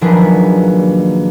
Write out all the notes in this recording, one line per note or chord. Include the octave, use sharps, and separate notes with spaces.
A#1 D#3 F#3 D4 G#4 B4